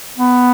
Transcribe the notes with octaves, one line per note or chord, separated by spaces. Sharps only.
B3